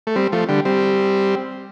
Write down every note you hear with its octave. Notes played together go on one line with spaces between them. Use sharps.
A3
G3 C4
F3 A3
D3 G3
G3 C4